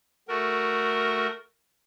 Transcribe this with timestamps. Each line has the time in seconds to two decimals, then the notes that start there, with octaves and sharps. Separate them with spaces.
0.29 A3 F#4 A#4